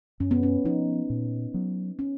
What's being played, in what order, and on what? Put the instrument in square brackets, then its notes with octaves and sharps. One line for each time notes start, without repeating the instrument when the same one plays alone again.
[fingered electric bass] F#2 [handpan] C#4
[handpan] B3
C#4
[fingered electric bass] F3 B3 [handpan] D#4
[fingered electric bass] A#2
F#3 B3
[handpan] C#4